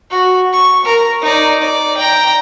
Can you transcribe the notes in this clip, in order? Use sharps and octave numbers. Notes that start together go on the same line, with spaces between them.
F#4
C#6
A#4
D#4 D5
D5
G5 A#5